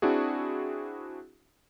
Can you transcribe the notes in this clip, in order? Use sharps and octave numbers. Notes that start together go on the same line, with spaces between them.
C4 D4 E4 F#4 G#4